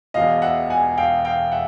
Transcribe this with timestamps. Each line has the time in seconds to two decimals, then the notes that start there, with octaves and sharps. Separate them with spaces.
0.14 E1 E2 B2 D#5 F5
0.42 E5 F#5
0.70 F#5 G#5
0.97 F5 G5
1.25 F5 G5
1.52 E5 F#5